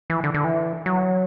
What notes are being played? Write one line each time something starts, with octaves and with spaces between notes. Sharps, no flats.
E3
D3
D3
E3
F#3